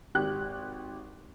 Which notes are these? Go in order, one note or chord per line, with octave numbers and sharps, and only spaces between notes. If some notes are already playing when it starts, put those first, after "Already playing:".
G#1 G4 F#6